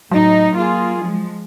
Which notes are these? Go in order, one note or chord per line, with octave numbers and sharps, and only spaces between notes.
A2 F#3 D#4
A#3 F4 G#4
F3 G#3